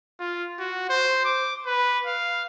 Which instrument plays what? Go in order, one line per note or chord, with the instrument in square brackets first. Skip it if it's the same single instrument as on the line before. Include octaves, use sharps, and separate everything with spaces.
[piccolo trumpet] F4
F#4
C5
D6
B4
F5